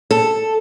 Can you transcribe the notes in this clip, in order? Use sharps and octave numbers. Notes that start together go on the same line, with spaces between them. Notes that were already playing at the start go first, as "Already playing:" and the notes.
A4